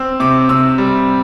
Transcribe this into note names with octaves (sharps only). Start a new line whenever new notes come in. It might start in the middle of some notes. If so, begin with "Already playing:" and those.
Already playing: C4 E6
C3 D6
C3 E6
G3